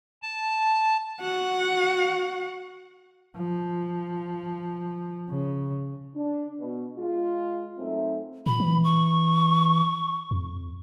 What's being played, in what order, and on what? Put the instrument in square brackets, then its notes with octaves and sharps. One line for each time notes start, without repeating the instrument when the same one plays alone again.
[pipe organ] A5
[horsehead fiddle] F#4 F#5
[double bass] F3
C#3
[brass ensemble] D4
B2
G#3 F4
F#2 A3 C4 D#4 E5
[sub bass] A#2 [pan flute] B5
[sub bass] E3
[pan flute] C#6
[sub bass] F2